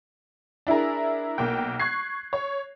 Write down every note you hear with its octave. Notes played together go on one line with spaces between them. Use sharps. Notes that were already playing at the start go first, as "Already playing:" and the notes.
D4 E4 G#4 A#4
B1 A#3 G5
C#6 F#6 G#6 C7
C#5